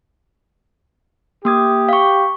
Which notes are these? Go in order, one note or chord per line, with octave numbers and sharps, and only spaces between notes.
A#3 G4 D#6 G#6
F5 C#6